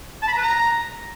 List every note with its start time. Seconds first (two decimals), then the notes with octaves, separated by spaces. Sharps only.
0.23 A5
0.28 B5
0.33 A#5
0.38 B4
0.43 A#5